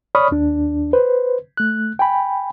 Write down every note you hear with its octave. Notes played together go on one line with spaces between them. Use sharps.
C#5 D5 B5 C#6 D#6 F6
D#2 D4
B4 C5
A3 F#6
G5 G#5 B5